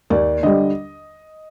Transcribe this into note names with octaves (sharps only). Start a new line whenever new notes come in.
D#2 D5
D3 G3 D#5